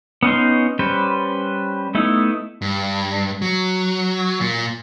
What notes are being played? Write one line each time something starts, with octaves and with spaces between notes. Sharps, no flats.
B3 C#4 D#4 C6
G3 C#4 B4 C5
A3 B3 D#4 E4
G2
F#3
A#2